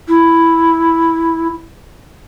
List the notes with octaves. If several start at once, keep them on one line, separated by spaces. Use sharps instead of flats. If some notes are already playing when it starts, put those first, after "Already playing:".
E4